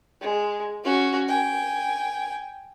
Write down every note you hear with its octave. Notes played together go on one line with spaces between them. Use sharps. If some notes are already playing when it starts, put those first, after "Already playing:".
G#3
C#4 F#4
G5 G#5